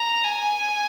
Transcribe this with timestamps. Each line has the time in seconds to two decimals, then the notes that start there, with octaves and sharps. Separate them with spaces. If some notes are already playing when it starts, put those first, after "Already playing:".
Already playing: A#5
0.24 G#5